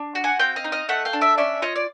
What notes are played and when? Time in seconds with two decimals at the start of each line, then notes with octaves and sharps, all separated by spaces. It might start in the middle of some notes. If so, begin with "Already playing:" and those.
Already playing: D4
0.15 F#4
0.24 F#5 G#5
0.39 C4 F5 G5
0.56 D#5 F5
0.64 D#4
0.72 D#5 F5
0.89 A3 E5 F#5
1.05 F5 G5
1.13 D4
1.21 D5 E5
1.38 C#4 D5 E5
1.62 F4 C#5 D#5
1.76 D5